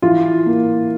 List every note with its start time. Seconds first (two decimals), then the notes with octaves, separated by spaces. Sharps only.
0.02 E3 F4
0.46 A#3